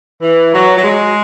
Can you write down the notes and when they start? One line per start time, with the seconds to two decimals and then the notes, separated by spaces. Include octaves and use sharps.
0.21 E3
0.53 F#3
0.77 F#3
0.84 G#3